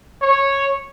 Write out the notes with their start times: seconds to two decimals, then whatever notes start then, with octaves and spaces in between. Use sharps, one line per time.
0.22 C#5